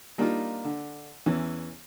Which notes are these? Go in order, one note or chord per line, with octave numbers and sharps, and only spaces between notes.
G3 A#3 D4 D#4 F4
D3
E2 E3 C#4